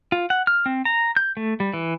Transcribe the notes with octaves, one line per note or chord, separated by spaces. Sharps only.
F4
F#5
F6
C4
A#5
G6
A3
G3
E3